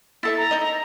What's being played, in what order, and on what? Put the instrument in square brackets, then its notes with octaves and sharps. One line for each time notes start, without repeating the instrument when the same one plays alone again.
[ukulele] E4 A4 E5 [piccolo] A6
[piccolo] A#5
[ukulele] D#4 D#5